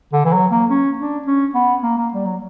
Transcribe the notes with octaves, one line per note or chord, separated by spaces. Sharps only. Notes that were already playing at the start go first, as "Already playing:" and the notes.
D3
E3
F#3
A#3
C#4
D4
C#4
B3
A#3
A#3
G3
F#3